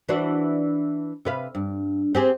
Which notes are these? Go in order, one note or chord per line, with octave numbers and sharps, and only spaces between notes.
E3 D4 F#4
C3 B4 F5
G2
C4 G4 G#4